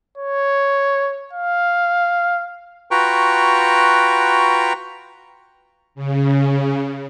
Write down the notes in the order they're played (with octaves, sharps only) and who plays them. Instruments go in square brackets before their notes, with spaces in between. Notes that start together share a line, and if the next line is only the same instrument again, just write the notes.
[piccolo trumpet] C#5
F5
[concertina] F4 F#4 B4 G5 A#5 C#6
[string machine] C#3